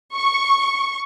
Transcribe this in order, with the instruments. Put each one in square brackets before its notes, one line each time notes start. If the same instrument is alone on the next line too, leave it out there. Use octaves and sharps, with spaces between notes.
[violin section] C#6